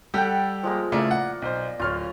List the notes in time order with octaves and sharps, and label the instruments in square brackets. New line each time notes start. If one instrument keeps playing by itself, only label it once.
[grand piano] G3 G4 [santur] A4 F#5 G5
[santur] F3 G#3 A#3
[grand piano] C#3 A3 E4 [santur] A#3 D5
[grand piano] F#5
B1 C5
[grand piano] D1 F6 [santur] F4 C#5